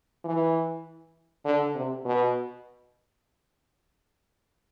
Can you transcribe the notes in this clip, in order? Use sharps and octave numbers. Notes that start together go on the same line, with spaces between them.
E3
D3
C3
B2